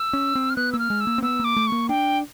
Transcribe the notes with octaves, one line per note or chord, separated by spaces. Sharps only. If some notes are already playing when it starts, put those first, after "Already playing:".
Already playing: E6
C#4
C4
F6
B3 F#6
A#3 E6
F6
G#3
E6
A#3
C4
B3 E6
A#3 D6
A3
A#3 C#6
D4 G5